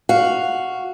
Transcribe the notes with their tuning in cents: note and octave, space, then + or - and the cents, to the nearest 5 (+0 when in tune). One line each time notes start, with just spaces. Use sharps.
F#4 +0 F5 +0